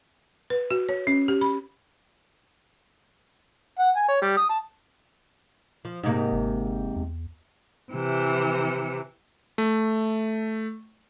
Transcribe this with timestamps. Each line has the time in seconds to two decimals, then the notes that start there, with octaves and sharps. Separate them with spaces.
0.50 B4
0.71 F#4
0.89 C#5
1.07 C#4
1.28 G4
1.41 B5
3.79 F#5
3.96 G#5
4.09 C#5
4.22 G3
4.37 D#6
4.50 A5
5.85 F3
6.03 G#2 C3 A#3 D#4
6.32 G1
6.96 E2
7.92 C3 E3
9.58 A3